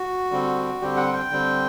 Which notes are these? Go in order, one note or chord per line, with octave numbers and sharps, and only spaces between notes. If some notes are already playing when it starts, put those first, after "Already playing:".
Already playing: F#4
D3 G3 C4
D3 G3 C4 G4
F#5
G5
D3 G3 C4